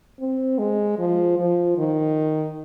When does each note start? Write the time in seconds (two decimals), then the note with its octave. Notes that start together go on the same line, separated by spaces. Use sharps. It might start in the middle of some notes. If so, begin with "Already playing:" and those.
0.20 C4
0.59 G#3
0.99 F3
1.39 F3
1.78 D#3